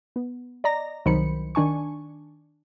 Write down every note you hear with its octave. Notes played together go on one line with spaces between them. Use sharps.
B3
D5 D#5 A#5 A#6
C2 D#3 F#3 C5 B5 C#7
D#3 D4 G#5 C#6